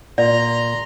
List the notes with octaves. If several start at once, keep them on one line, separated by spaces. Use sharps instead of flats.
A#2 D5 A#5 C6